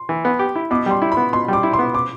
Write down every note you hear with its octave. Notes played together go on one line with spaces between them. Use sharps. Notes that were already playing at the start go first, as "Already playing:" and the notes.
Already playing: C6
E3
B3
G4
E4
B2 D6
G3 C6
E4
B5
B3
B2 C6
G3 D6
E4
C6
B3
D6